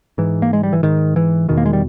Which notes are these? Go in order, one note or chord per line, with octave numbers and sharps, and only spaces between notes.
G#2 E3
A#3
G#3
G3
E3
G#2 D#3
E3
E2 B2 D#3
A#3
G#3
G3